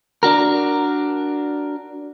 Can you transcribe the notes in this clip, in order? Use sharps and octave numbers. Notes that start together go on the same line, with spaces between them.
D4 F#4 A#4